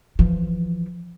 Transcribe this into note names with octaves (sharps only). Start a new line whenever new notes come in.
E3 F3